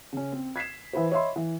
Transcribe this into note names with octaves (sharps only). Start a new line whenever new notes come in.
C#3 C#4
C4
G#6 B6 C7 E7
E3 E4 B4 C5
C#5 D#5 E5 B5 C6
E3